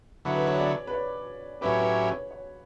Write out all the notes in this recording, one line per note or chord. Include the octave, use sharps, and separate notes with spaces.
D3 F#3 B3 E4
B4
C#5
D5
B4
C#5
A2 F#3 C#4 E4 G4 B4
B4
C#5
C#5
C#5